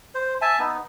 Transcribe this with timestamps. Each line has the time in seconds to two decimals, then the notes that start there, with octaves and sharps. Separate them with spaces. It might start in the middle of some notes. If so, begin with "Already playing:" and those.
0.15 C5
0.42 E5 G#5 A5
0.59 B3 D#4